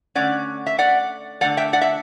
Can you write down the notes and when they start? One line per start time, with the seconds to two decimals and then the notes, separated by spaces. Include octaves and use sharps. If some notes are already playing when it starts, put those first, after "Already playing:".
0.15 D3 A3 C#4 D5 F#5
0.66 E5
0.79 D5 F#5
1.41 D3 A3 D4 D5 F#5
1.57 E5 G5
1.73 D5 F#5
1.81 E5